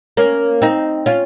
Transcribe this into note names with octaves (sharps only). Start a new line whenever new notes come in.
A#3 C#4
C4 D#4
C#4 F4